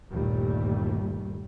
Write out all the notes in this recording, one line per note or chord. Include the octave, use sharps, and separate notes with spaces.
G1 D#2 A#2 G3 A3